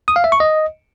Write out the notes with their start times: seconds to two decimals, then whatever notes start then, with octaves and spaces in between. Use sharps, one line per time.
0.08 D#6
0.16 F5
0.24 E5
0.32 C#6
0.40 D#5